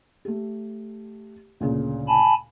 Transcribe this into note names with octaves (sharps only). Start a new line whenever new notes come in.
A3 G4
D2 A#2 C#3
G#5 A5 B5